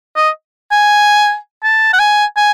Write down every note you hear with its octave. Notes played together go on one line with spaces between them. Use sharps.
D#5
G#5
A5
F#5
G#5
G#5